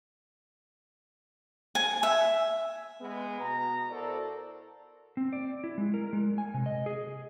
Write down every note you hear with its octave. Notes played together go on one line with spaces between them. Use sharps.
G#5
E5
G#3 B3
B2 A#5
E4 F#4 A4 A#4 C5 D5
C4
D5
E4
G#3
A#4
G#3
G#5
C3
D#5
G#4